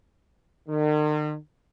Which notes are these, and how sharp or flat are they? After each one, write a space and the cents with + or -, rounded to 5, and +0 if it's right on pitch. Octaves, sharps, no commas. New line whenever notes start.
D#3 -45